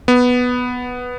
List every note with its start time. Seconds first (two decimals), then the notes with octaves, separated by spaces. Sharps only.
0.08 B3